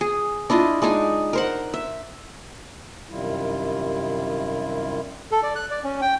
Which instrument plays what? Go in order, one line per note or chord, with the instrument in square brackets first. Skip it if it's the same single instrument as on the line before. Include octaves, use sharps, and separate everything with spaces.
[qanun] G#4
D4 E4 F4 D#5
G#3 D4 D#4 G#5
A#4 C5 F#5
E5
[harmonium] F#2 C3 D#3 G3 E4 F4
[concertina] A4
D5
F#6
D5
C#4
G5